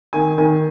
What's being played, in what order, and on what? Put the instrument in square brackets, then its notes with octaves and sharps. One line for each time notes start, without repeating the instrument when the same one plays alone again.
[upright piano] D#3 [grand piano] G#5
[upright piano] D#3 [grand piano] G#5